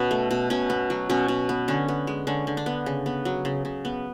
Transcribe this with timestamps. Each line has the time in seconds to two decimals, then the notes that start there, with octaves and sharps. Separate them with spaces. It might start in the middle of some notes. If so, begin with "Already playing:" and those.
Already playing: B2 B3 C#4
0.11 A3
0.31 B2
0.50 B2 C#4
0.70 B3
0.90 F#3
1.10 B2 C#4
1.28 B2
1.49 B3
1.68 D3 C#4
1.88 B3
2.07 G#3
2.27 D3 C#4
2.47 D3
2.57 D4
2.66 B3
2.86 C#3
3.06 B3
3.25 F#3
3.45 C#3
3.65 C#3
3.85 B3